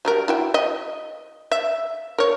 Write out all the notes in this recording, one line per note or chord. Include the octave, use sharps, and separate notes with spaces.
F#3 G3 A#4
E4 F#4 G5
D#5
E5
A#4 C#5